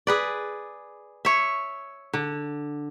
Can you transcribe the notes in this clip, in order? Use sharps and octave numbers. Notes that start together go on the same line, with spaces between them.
G#4 B4 D5
C#5 E5
D3